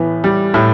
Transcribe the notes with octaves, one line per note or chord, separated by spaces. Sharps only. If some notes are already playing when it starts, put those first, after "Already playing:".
Already playing: A2 E3 B3
G3
A2